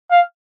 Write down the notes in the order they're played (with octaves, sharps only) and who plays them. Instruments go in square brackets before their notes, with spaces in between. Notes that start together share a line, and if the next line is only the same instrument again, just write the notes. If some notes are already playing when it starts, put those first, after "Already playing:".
[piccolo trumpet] F5